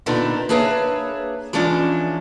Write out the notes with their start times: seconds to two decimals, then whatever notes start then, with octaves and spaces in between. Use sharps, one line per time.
0.06 A#2 D3 B3 D4 D#4
0.49 A#3 D4 G#4 B4 C#5 E5
1.53 E3 F3 G#3 C#4 D4